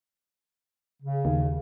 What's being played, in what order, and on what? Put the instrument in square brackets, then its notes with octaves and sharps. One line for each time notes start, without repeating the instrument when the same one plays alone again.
[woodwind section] C#3
[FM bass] D#2